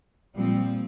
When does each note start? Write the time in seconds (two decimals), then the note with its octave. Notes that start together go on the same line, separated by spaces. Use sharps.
0.35 A#2 F3 G3 C4